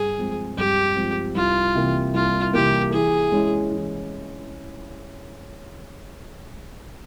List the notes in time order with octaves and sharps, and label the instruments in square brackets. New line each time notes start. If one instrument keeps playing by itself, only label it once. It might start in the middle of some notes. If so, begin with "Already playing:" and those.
Already playing: [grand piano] G2 [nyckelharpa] G#4
[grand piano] F3 G#3 C4
[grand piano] G2 [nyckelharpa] G4
[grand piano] F3 G#3 C4
[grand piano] C2 [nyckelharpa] F4
[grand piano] C3 E3 A#3
[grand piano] C2 [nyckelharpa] F4
[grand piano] C3 E3 A#3 [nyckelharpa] G4
[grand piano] E3 [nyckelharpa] G#4
[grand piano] G#3 C#4 E4
E3